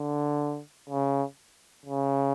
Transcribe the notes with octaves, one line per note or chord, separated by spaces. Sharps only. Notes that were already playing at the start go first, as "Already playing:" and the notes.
Already playing: D3
C#3
C#3